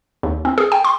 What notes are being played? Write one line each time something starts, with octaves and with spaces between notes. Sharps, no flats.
D#2
C4
G#4
G5
C6